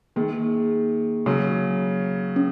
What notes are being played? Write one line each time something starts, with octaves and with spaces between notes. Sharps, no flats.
D#3 A#3 D#4 G#4
C#3 F#3
C#4